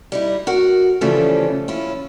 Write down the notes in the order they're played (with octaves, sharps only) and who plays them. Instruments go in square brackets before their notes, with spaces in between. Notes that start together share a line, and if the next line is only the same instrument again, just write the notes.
[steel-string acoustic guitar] G3 D#4 E4
F#4 A#4 F#5
C#3 E3 F3 G3 A3 C#4
C#4 E4 F4